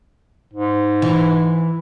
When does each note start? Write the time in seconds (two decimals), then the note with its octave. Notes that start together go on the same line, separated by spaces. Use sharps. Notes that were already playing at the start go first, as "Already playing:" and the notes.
0.53 G#2
1.02 E3